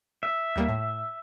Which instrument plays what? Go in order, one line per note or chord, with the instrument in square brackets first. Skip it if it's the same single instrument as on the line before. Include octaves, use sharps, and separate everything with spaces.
[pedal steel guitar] E5
[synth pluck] D#2 G3 A#3
A2